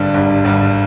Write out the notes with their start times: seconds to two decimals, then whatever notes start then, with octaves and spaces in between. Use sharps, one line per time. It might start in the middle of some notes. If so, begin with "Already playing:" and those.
Already playing: G#1 G2 D3 G3
0.14 G#1 G2 D3 G3
0.44 G#1 G2 D3 G3